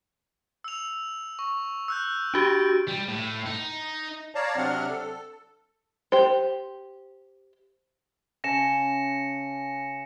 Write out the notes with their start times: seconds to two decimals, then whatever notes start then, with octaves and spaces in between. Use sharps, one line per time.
0.64 E6 F7
1.39 C#6
1.88 E6 F#6 G6
2.34 D4 F#4 G4 D7
2.88 G3
3.09 A2
3.46 D#4
4.35 C#5 D5 F5 A5 A#5
4.56 C3 F#3 C4 D4 F#5 F6
4.90 A4
6.12 G4 C5
8.44 C#3 G#5 A5 A#6 C#7 E7